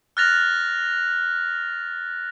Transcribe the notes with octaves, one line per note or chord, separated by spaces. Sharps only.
F6 F#6 A6 A#6 F7